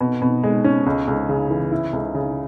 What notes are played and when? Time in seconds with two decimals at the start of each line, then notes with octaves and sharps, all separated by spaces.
0.01 B2
0.22 B2
0.43 G#3
0.64 C#4
0.86 C#2
1.08 C#2
1.29 C#3
1.50 E3
1.72 E4
1.93 C#2
2.15 C#3